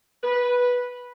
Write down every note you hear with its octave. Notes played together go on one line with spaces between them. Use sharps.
B4